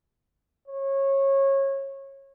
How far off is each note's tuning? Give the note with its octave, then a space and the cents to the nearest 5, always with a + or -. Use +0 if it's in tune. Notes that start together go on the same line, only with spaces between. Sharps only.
C#5 -20